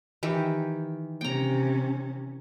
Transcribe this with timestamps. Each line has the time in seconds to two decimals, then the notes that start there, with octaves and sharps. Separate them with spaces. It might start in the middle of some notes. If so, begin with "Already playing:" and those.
0.23 D#3 E3 G4
1.21 C3 C#4 G5 A#5